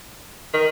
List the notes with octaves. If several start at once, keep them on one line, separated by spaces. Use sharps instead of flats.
D#3